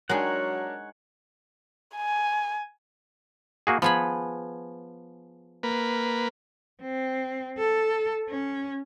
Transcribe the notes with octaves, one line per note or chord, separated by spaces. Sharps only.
F#3 G#3 D4 D#4 G#4 A#4 C#5 F#5
G#5
A#3 F#4 G#4
F3 B3 G#4 B5
A#3 B4
C4
A4
C#4